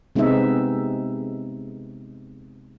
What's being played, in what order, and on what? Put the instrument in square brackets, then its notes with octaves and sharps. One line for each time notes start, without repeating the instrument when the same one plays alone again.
[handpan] C3 G#3 B3 C4 D#4 E5